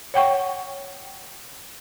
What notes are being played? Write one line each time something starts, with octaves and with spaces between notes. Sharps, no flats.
C#5 F#5 G5 C#6